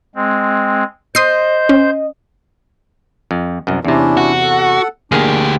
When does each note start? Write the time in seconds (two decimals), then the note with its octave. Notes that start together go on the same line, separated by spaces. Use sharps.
0.16 G#3 C4
1.15 C5 D#5 C6 D#6 G6 C7
1.69 C#4
3.31 F2
3.67 C2 F#2
3.85 E2 C3 C#4 D4 E4
4.17 F#4
4.42 A4 F#5
5.12 D2 A#3 D4 G4 G#4